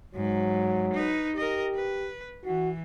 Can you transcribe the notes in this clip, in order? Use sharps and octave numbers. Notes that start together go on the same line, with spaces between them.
G#2 F#3
D#4 B4
G4 A#4 D#5
B4
E3 F#4